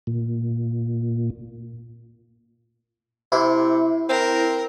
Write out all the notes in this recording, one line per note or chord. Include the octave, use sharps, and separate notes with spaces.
A#2
C3 E4
C4 A#4